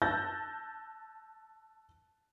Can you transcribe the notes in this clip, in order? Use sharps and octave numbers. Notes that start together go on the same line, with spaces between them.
A5 E6 F#6 G6 A6 A#6